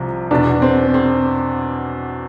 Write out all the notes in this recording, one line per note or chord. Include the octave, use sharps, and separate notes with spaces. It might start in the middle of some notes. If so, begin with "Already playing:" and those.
Already playing: C2 C3 F3
E2 B2 D4
C4
C4